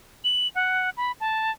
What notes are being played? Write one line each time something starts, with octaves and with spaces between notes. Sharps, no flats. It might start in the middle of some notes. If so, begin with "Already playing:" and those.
F#7
F#5
B5
A5